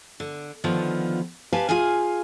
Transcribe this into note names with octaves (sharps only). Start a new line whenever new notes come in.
D3
D3 D#3 F3 B3 F4
G4 B4 F5 G#5 A5
F4 G#4 F5 G#5